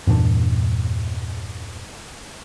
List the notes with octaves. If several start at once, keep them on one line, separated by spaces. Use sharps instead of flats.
E2 G2 A#2 D4